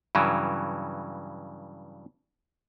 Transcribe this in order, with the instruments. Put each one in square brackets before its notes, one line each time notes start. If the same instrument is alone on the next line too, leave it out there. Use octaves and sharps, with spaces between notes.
[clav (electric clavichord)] G2 C#3 E3 F#3